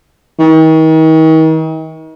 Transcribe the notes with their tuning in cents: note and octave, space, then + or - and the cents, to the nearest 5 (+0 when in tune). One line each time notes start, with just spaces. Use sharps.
D#3 +40